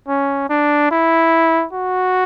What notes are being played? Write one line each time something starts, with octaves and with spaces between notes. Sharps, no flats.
C#4
D4
E4
F#4